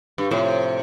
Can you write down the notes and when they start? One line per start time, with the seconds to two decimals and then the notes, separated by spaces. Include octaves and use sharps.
0.18 G2
0.31 A2 C3 F3 C4